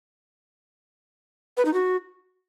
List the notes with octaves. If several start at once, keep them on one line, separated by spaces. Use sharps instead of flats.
B4
D#4
F#4